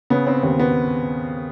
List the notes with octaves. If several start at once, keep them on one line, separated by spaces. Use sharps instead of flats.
C#3 B3
C4
D#2 C4
B3